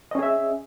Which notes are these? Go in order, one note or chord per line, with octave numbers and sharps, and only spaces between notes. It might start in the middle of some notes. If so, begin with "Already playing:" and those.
C#4 G#4 D#5 E5